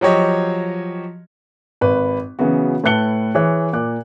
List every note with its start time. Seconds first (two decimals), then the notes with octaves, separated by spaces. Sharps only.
0.01 F3 F#3 G4 C#5 D#5
1.81 G#1 B4
2.39 C#3 E3 F#3 B3 F#4
2.84 A2 B4 A5 F#6 C#7 G7
3.35 E3 G#4 C#5 F#6
3.73 A#2 D6 F#6